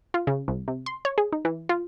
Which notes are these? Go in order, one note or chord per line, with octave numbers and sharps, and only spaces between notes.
F4
C#3
C2
C3
C6
C#5
G#4
D#4
E3
F4